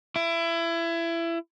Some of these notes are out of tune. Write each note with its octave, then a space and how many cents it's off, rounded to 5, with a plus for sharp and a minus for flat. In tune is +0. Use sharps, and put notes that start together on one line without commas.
E4 +25